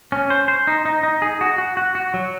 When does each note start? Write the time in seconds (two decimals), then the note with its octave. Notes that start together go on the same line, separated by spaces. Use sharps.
0.12 C#4
0.30 C5
0.48 C5
0.67 D#4
0.85 D#4
1.03 D#4
1.22 G#4
1.41 F#4
1.58 F#4
1.77 F#4
1.95 F#4
2.14 F#3